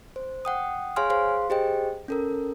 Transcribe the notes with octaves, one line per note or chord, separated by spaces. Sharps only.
C5
F#5 G5 D#6
G#4 C#5 F5 G#5 C6 F6
G#4 C5 F5 C6
G4 G#4 C5 D#5 G5
C#4 A4 A#4